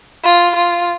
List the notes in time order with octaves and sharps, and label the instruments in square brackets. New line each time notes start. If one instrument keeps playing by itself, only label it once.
[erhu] F4
F4